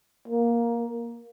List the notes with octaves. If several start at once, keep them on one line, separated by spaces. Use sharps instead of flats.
A#3